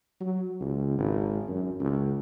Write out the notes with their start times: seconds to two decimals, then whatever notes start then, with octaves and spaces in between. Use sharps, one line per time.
0.21 F#3
0.61 C#2
0.98 G#1
1.49 F#2
1.80 C#2